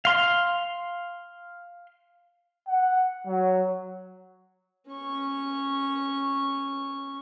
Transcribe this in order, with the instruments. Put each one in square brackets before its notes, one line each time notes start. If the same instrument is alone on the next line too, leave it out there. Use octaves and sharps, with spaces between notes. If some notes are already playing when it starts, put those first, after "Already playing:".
[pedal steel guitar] F5 C6
[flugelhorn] F#5
F#3
[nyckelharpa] C#4 C#6